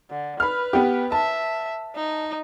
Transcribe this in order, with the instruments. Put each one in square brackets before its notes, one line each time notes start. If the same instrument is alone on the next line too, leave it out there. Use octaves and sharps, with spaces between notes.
[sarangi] D3
[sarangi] B4 [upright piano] B5 F6
[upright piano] B3 G4
[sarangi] E5 [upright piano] A5
[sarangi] D#4